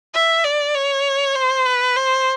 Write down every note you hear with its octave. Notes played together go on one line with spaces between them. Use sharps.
E5
D5
C#5
C5
B4
C5